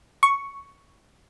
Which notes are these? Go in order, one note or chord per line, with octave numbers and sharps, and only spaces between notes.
C#6